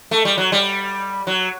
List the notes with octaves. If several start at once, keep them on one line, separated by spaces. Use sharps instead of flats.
A3
G3
F#3
G3
F#3